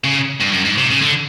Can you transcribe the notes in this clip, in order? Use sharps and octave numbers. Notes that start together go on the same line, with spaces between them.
C#3
G2
F#2
G#2
C3
C#3
D3